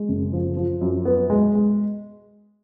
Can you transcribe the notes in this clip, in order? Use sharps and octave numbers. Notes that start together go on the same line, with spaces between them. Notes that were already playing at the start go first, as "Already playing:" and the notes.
Already playing: G#3
F#1
F3
F3
F#2
B3
G#3
G#3